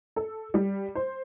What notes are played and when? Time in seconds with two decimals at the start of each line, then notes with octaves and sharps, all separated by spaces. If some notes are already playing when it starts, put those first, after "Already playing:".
0.16 A4
0.54 G3
0.95 C5